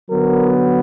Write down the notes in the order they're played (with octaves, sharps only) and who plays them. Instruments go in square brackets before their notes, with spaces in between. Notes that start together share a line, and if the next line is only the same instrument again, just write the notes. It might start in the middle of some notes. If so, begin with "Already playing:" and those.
[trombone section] D3 F#3 B3 A#4